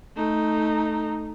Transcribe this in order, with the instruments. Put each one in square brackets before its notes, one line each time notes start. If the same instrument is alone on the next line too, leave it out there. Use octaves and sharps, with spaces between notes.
[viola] A3 D#4